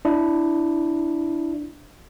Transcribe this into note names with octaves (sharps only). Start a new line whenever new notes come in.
D4 E4